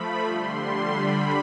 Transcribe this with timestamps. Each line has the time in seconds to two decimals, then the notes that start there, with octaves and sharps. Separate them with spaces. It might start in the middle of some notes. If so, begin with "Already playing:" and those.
Already playing: F3 A3 B5
0.24 D3 G3 C6
0.95 D3 G3 B5